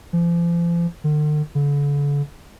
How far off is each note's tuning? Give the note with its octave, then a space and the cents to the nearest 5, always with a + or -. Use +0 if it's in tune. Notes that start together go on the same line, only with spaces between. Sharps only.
F3 -40
D3 +45
D3 -40